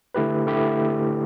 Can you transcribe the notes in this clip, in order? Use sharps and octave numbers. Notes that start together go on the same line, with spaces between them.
D3 A3 E4 G4 B4
D3 A3 E4 G4